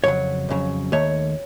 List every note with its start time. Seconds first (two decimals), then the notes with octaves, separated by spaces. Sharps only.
0.04 F2 C#3 F#3 C#5
0.49 F2 C#3 F#3
0.92 D#2 D#3 A3 C#5